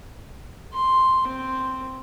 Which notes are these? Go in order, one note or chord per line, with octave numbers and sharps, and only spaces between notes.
C6
C4